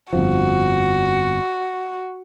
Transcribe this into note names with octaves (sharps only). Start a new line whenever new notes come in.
G1 F2 F3 F#4